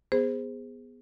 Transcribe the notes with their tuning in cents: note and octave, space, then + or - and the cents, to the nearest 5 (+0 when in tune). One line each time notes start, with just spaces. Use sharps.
B3 +0 G#4 -15 C5 -10